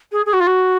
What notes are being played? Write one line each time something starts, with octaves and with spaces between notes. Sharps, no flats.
G#4
G#4
F#4
F4
F#4